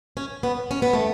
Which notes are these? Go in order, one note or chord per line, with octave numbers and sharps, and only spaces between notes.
C#4
B3
C#4
B3
A3